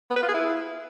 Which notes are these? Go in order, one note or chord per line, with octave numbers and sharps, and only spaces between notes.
B3
B4
F4
G#4
E4